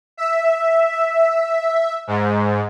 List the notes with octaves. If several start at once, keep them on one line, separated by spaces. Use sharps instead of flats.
E5
G#2